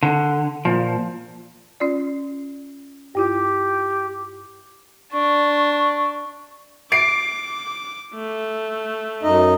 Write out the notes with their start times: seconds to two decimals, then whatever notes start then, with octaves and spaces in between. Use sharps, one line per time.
0.03 D3
0.65 A#2 F3
1.80 C#4 F4 D5
3.15 G2 E4 F4 G4
5.12 D4 C#6
6.92 D6 C7 D7
8.15 A3
9.23 F#2 D#4 D#5